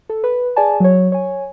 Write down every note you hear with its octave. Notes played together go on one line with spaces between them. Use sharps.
A4
B4
G#4 D5 G#5 A5
F#3 C#5
C#5 G#5